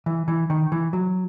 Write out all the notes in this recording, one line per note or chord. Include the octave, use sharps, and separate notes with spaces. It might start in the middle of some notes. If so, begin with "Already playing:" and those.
E3
E3
D#3
E3
F#3